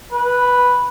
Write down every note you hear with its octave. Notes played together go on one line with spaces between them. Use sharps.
B4